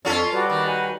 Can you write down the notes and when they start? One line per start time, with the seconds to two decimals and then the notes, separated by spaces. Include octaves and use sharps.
0.05 F2 C#4 F4 A4
0.33 G3 F#4 B4 D5
0.50 D#3
0.68 F#4 F#5 G#5